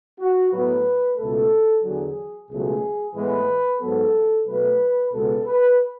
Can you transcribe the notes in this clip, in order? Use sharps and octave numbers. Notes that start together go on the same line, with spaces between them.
F#4
A2 F#3 B3 B4
C#2 B2 A3 A4
E2 D3 F#3 G#4
C#2 B2 F#3 A3 G#4
A2 E3 G#3 B3 B4
G#2 F#3 B3 A4
B2 F#3 A3 B4
C#2 B2 G#3 B3 A4
B4